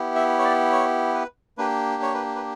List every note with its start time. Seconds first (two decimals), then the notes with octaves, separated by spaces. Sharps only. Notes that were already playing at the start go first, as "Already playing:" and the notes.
Already playing: B3 E4 G4
0.15 E5
0.39 C#5
0.45 D5
0.72 C#5
1.14 B4
1.58 A#3 D4 G4 B4
2.02 C#5
2.14 B4
2.36 B4